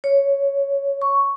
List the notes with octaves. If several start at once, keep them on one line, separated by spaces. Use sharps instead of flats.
C#5
C#6